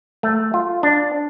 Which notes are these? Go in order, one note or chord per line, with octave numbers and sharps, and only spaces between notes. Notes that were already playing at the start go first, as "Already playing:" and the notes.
A3
F4
D4